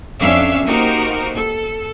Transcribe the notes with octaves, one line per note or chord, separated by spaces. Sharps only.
F2 C#4 D4 E5 F5
A#3 D#4 F#4 G4 A#4 C5
A4